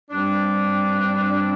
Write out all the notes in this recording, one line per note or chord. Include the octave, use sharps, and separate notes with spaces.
G2 G3 C4 D4